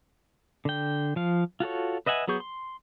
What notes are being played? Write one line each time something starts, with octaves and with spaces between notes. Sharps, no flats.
D3 G5
F3 F5
F4 F#4 A4 C#5
B4 D#5 E5 F#5 G#5
F#3 B3 G#4 C#6 G6
C6